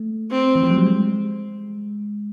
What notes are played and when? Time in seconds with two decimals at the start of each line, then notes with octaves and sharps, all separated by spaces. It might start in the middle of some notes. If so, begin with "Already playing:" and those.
Already playing: A3
0.30 C4
0.55 E3
0.63 F3
0.70 F#3
0.77 G3
0.86 G#3